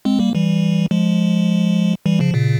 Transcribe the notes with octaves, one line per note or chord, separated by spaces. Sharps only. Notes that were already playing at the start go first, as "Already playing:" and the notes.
G#3 C4
G3 A#3
E3 G3
F3 G#3
E3 G3
C#3 F3
A#2 C#3